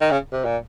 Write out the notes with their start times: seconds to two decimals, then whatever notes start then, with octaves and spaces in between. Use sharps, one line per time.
0.01 D#3
0.11 C#3
0.33 C3
0.45 A#2